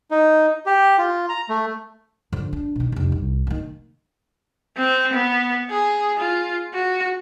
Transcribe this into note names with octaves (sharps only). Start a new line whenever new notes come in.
D#4
G4
F4
A#5
A3
D3 F3
D4
B2 D#3
F1 C#2
C2
D#3 A#3
C4
B3
G#4
F4
F#4